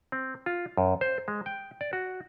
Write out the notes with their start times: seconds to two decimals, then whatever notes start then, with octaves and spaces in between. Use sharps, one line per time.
0.12 C4
0.46 F4
0.77 F#2
1.01 C5
1.28 G#3
1.46 G5
1.81 D5
1.93 F#4